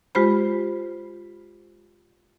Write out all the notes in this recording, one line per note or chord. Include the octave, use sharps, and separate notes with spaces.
G#3 F4 G4 C5 B5